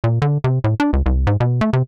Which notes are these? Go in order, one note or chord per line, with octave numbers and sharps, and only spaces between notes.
A#2
D3
C3
A2
D4
C#2
C2
G#2
B2
A3
C3